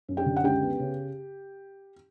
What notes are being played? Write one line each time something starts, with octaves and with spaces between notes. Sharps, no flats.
F#2
G4 G5
D3
F#5
C#2 G4 G5
B3
C#3